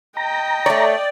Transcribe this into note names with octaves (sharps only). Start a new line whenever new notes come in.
D#5 G5 A#5
A3 C#5 D5